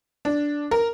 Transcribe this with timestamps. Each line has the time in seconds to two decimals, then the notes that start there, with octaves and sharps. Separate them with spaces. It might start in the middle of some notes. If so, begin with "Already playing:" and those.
0.25 D4
0.71 A#4